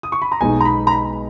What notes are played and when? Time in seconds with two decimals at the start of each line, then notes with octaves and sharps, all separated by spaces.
0.03 D#6
0.12 C#6
0.22 B5
0.32 A#5
0.41 B1 B2 G#3 D#4 G#5
0.61 A#5
0.65 B5
0.87 A#5
0.91 B5